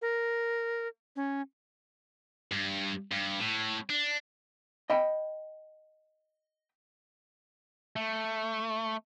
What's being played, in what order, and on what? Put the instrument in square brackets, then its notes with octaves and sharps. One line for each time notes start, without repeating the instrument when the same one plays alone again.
[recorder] A#4
C#4
[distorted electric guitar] G2
G2
A2
D4
[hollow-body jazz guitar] D#5 G5 B5
[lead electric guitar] A3